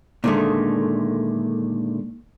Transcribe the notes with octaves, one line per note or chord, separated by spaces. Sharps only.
A#2 D3 D#3 G#3 A3